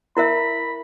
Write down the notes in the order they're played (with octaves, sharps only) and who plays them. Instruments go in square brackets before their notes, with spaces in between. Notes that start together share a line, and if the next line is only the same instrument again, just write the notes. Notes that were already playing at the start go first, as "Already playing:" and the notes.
[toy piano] E4 A#4 E5 [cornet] B5